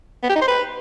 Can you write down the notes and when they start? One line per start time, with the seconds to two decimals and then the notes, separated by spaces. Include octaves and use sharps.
0.23 B3
0.29 G4
0.35 D#4
0.42 C5
0.48 B4